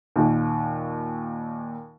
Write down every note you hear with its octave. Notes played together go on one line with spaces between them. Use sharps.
D#2 A#2